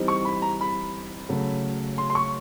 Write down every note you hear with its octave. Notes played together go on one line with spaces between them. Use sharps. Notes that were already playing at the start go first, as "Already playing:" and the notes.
Already playing: E3 G3 C4 D#4
C#6
B5
A#5
B5
C#3 F#3 A3
C6
C6
C#6